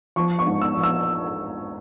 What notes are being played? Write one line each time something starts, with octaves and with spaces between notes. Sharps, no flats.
F3 C#6
C#6
G#2
E6
A#1
E6